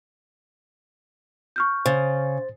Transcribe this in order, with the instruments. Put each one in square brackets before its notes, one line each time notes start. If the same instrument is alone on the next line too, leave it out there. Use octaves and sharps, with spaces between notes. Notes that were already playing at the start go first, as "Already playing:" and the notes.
[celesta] C#6 F6 G6
[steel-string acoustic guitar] C#3 [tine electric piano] C5 A6